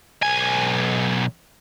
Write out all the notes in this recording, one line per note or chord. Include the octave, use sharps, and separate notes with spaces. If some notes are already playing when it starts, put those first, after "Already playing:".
B1 G#5